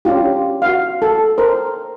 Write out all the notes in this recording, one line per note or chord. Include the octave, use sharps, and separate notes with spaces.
C#4 D4 F4 G4
F#4 F5
A4
A#4 C5